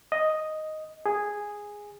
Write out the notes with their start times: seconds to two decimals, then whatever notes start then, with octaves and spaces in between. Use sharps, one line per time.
0.12 D#5
1.06 G#4